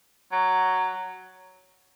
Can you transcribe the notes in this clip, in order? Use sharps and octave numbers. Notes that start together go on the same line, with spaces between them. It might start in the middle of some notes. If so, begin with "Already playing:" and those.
F#3